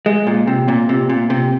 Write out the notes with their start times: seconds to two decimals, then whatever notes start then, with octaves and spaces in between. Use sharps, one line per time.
0.06 G#3
0.27 A#2
0.47 C3
0.68 A#2
0.89 C3
1.09 A#2
1.30 C3